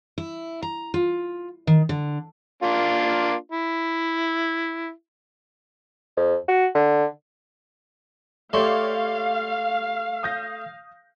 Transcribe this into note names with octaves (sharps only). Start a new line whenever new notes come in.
E4
A#5
F4
D#3
D3
A#3 D4 F4
E4
F2
F#4
D3
A3 G4 C#5 D5 F5 C6
D#6 G6 A#6